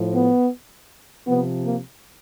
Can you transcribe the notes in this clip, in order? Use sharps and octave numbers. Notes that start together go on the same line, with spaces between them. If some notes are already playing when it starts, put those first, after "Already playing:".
Already playing: A2 F3
B3
C3 F3 B3
A#3